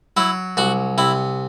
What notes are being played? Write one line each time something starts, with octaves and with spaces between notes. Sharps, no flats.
F#3 E4
C2 F#4
C3 E4